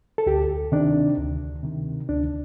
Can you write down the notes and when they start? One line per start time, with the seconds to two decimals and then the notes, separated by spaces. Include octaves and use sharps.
0.18 A4
0.26 D2 G4
0.72 C3 D#3 D4
1.18 D2
1.63 C3 D#3
2.09 D2 D4